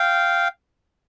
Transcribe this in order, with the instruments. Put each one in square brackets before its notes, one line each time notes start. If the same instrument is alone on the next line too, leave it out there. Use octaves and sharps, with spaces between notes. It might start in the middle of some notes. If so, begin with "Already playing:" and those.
Already playing: [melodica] F5 G5